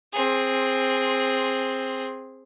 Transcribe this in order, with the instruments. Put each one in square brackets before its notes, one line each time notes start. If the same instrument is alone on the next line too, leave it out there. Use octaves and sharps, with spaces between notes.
[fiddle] C4 G#4